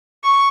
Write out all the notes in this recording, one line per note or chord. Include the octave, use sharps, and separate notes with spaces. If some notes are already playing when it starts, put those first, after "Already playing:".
C#6